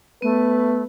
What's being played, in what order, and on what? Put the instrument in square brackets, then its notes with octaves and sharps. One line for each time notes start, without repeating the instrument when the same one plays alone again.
[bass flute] A3 [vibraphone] B3 [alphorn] B4